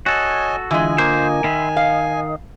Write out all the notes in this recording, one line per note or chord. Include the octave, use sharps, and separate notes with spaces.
F#4 A4 C#5 D#5 G#5
D3 E3 G#3 F4 D#5 G#5
A#3 C5
D#3 E5 B5 C6
D#5 F5